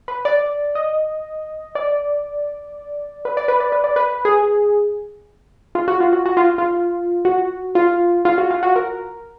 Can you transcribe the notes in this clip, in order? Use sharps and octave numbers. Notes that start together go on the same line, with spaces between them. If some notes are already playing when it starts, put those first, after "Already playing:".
B4
D5
D#5
D5
B4
D5
B4
D5
B4
D5
B4
G#4
F4
F#4
F4
F#4
F#4
F4
F4
F#4
F4
F4
F#4
F4
F#4
A#4